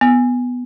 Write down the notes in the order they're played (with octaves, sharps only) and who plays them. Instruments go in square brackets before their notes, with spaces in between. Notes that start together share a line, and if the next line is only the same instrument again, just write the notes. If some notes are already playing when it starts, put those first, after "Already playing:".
[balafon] B3